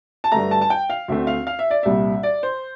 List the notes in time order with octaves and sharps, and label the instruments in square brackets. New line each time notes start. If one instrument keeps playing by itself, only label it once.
[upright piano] A5
G2 D3 A3 A#5
A5
A5
G5
F5
D2 D3 A3 C4 E5
F5
F5
E5
D5
C2 A#2 G3 E5
D5
C5